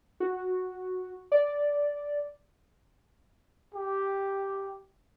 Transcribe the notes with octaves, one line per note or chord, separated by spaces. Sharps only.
F#4
D5
G4